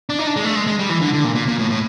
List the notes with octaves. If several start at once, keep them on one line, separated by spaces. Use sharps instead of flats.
D4
D#4
D4
G#3
A3
G#3
G#3
G3
E3
D3
D3
A#2
A#2
A#2
A2
A2